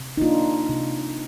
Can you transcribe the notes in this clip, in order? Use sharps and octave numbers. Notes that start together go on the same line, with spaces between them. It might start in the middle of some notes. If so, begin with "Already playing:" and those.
Already playing: C3
D#4
A#3 D4 F4
C3